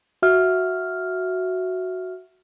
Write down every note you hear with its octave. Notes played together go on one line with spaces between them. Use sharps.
F#4 E5 F6